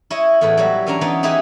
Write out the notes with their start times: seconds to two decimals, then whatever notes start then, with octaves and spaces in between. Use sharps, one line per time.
0.10 E4 C#5 D#5
0.41 E2 A2 B4
0.57 F#3 G3 F#4
0.86 E3 C#4 D4 A#5
1.01 E3 B3 D#4
1.23 D#4 E4 G4 G#4 B4 D#5